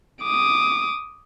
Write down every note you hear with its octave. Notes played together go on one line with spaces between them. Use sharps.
D6 D#6